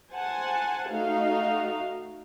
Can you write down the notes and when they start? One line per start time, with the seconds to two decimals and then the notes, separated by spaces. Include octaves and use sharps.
0.13 C5 F#5 G#5 A5
0.91 A3 D#4 F#4 F5